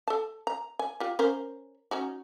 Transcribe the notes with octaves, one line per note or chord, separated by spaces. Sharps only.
A4 A5
A#5
G#5
F4 G4
C#4 A#4 C5
C#4 D#4 F#4